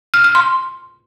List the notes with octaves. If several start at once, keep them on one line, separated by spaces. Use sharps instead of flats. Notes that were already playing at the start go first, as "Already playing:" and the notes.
F6
F6
C6